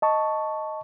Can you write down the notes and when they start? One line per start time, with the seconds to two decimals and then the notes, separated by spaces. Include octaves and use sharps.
0.02 D#5 A5 C#6